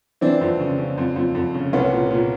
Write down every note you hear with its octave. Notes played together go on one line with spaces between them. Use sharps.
E3 C4 D4
F2
C#3
C#3
F2
F2
F2
C#3
C2 B3 C#4
A#2
A#2